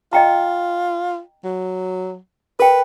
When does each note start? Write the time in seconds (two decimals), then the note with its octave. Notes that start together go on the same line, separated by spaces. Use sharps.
0.13 F4 D#5 G5 A#5
1.44 F#3
2.60 A#4 B4 G5